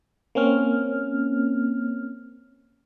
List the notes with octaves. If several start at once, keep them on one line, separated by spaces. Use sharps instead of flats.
A#3 C4 C#4 F6